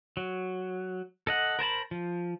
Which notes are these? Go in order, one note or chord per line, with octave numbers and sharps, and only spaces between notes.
F#3
A4 D#5 F#5
A#4 C5 A5 B5
F3